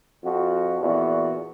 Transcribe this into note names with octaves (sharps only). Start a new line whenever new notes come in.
F2 F#4
E2 A#2 F#4